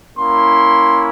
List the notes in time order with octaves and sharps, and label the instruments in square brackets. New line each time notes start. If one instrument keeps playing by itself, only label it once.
[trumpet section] A#3 C#4 E4 C6